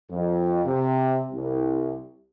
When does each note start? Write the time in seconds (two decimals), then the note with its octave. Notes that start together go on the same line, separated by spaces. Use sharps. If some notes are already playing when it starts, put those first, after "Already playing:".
0.10 F2
0.64 C3
1.31 C2